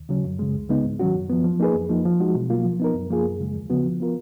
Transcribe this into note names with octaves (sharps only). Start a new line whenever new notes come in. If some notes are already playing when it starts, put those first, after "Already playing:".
Already playing: D#2
C#3 F#3 C#4
F#2
C#3 G#3
C#2
C#3 G#3 B3 D#4
G#2
D#3 F#3 C#4 F#4
F#2
F3 B3
F3
A#3 D#4 G#4 B4
F2
F3 A#3 D#4
F3
G#3 D#4 F#4
B2
F#3 A#3 F4
F3
B3 D#4 A#4
F#2
F3 A#3 F4 G#4
F#2
C#3 G#3
D#2
C#3 F3 B3 F#4
F3
B3 F4 A#4